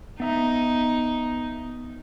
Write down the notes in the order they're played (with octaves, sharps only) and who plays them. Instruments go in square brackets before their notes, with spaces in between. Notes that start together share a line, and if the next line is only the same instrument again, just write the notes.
[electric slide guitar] B3 E5 A#5 [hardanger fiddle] D#4